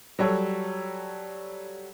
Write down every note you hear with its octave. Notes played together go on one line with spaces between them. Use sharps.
F#3 G3 A4 C#5